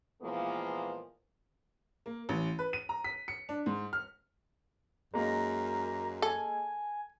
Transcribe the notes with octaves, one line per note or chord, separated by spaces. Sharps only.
A#2 E3 F3 G#3 A#3 B3
A#3
A1
B4
D#7
A#5
B6
C#7
D4
G#2
F6
F#2 G#3 A#3 D#4 A#5
A4 G#5